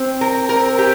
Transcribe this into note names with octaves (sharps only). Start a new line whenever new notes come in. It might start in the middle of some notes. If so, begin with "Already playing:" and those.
Already playing: C4
A#4
A#4
G4